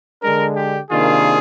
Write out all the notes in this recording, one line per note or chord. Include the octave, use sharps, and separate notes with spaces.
D3 G#3 D4 A#4
G4
C3 D#3 A#3 D4 F4 G#4